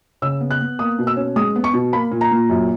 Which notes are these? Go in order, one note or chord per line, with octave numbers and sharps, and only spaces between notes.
C#3 E6
B3
F#6
B3
A#3 D#6
B2
E6
C#4
G#3 D#6
B3
C#6
B2
A#3 B5
A#2
A#5
A#2
F#2